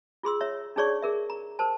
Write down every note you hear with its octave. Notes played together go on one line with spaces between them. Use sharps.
F4 G#4 C6 E6
C#5 E5 A#5
D4 D#4 G#4 C#5 D5 C#6
G#4 A#4 E5
A#5
A#4 C5 A5